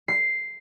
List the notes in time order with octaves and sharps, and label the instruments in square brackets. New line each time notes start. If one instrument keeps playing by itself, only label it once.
[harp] C7